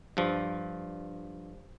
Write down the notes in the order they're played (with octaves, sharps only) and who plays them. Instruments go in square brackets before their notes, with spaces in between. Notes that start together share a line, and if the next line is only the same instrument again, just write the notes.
[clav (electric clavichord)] G2 F3